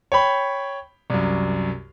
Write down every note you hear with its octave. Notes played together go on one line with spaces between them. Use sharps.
C#5 G5 B5
C2 F#2